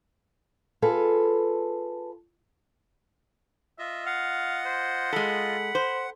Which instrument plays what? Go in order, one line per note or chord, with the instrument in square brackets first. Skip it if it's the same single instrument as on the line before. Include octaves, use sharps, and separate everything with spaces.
[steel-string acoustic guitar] F4 G#4 A4 B4
[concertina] F4 D#5 [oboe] E5
[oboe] F5 [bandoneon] F#5
[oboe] C5
[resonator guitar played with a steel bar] G#3 A4 [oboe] B5
[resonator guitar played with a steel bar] C5